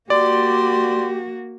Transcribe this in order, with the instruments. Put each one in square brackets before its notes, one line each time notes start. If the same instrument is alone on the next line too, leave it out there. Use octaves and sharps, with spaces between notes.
[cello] A#3 F#4 [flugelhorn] G4 [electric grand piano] D5 [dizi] C6